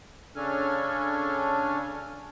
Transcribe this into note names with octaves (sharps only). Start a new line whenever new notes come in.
C#3 C#4 D4 A4 G#5 F6